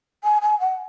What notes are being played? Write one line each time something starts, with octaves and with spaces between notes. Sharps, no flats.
G#5
G#5
F#5